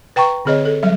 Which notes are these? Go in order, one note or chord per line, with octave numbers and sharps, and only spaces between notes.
B4 G5 A#5 C#6
D3 C4 G#4 C#5 D#5
A4
F#3 G3 E5